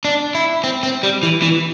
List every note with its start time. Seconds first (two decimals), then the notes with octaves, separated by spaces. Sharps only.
0.05 D4
0.35 E4
0.64 C4
0.83 C4
1.03 G3
1.23 E3
1.42 E3